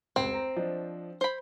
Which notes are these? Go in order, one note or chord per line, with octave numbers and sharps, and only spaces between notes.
F1 C#2 C4
A#5
F3 D4 D#5
C5 B5